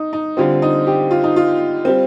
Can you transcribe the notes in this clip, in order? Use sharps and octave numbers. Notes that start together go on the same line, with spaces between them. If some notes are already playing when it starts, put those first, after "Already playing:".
Already playing: D#4
D#4
D3 G3 C4 F4
D#4
G4
F4
D#4
F4
G3 C4